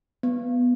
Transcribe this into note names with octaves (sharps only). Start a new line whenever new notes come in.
B3